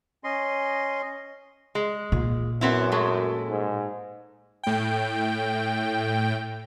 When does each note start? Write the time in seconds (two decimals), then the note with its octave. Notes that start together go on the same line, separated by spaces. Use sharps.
0.24 C#4 D#5 C6
1.75 G#3
2.12 A#2
2.61 F#2 B3 C4 E4
2.92 G#3 A3
3.50 G#2
4.63 A2 G5